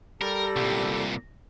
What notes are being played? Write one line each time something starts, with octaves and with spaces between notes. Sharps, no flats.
G3 G4 A4 A#4
C2 A#2